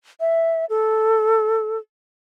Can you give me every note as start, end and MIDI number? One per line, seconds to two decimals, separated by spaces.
0.20 0.65 76
0.70 1.78 69